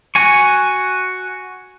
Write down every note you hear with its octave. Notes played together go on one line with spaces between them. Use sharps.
F#4 G#5 C#6